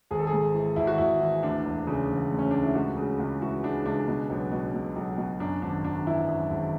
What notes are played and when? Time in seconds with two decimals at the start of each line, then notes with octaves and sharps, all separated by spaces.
0.11 G#1 G#4
0.19 A4
0.27 G#4
0.33 G#2
0.55 E3
0.76 G#1 E4
0.87 F#4
0.98 G#1 E4
1.21 E3
1.43 D2 D4
1.65 E1
1.87 C#3
2.10 E1
2.31 D2
2.39 C#4
2.51 D2 D4
2.63 E4
2.75 C#2 F#4
2.97 C#3
3.19 C#2
3.42 E3 F#4
3.64 C#3 D4
3.85 C#2 D4
4.08 B2
4.30 B1
4.52 B2
4.74 B2
4.96 B1
5.18 B2
5.40 F#2 D4
5.62 G#1 D4
5.84 G#1 D4
6.06 E3 E4
6.28 F#2
6.51 G#1